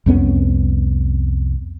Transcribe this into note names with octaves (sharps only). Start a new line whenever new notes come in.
C2 F2 B3 C#4